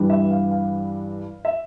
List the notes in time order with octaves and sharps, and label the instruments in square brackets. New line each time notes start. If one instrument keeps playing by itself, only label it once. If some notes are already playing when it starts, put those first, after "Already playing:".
Already playing: [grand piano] G2 E3 G3 D4
E5
F5
F5
E5